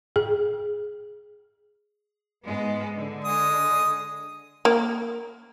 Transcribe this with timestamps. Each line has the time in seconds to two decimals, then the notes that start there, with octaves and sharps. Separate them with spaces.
0.16 G#4
2.45 G#2 G#3 B3
2.96 D3
3.25 G#3 D#6
4.65 A#3